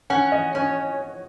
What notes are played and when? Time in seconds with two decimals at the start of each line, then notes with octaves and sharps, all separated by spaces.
0.10 C#4 F#5
0.32 D#5
0.55 C#4 C#5